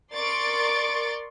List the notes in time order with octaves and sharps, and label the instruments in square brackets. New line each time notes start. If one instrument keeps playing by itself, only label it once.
[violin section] A#4 D5 C6 C#6 A6 D7